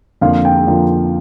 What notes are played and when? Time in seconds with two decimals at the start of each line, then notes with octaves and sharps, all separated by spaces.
0.21 F2 D3 F3 A#3 F5
0.45 G5
0.67 F2 D3 F3 A#3